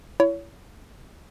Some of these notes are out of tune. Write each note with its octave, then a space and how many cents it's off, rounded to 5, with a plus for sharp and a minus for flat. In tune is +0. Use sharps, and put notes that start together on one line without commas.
E4 +25 C#5 +25